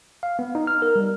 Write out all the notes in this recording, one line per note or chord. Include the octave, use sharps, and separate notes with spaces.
F5
B3
D#4
F6
A#4
G3